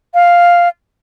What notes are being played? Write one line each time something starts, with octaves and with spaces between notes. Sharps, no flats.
F5